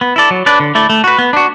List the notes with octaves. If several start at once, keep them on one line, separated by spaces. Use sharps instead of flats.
B3
E4 A4 D5
F#3
D4 B4 D5
D3
A3 E4 D5
A3
F#4 B4
B3
D4 F#4